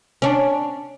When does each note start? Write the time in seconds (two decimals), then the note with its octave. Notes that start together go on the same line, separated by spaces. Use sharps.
0.22 C#4 D4